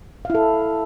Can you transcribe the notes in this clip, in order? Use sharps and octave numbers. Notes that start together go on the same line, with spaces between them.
E4 A4 F5